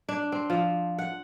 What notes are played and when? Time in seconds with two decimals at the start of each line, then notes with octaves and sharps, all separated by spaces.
0.09 D4
0.32 C4
0.50 F3
0.98 F#5